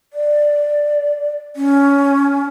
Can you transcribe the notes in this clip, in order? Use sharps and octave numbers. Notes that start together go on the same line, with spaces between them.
D5
C#4